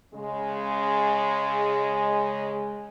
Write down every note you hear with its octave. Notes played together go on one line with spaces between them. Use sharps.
C#3 G#3